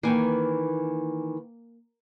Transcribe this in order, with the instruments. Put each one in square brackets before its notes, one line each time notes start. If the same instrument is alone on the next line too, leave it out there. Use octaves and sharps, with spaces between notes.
[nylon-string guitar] D#3 E3 [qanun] A#3 G#5